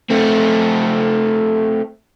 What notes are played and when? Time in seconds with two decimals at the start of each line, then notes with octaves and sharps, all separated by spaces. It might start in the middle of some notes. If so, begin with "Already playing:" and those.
0.10 A3 C4